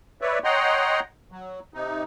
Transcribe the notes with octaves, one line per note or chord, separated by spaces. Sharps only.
B4 C#5 D5 E5
C#5 D#5 F#5 G5 A#5 C6
F#3
C3 D#4